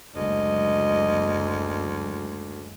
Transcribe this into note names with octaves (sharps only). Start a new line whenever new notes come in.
F#1 D2 G#3 D#5